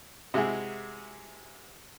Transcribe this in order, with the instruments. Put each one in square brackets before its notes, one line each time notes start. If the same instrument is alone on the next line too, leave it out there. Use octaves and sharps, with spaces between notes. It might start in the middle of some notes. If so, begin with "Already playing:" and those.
[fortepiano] C3 G#3 E4 F#4 G#4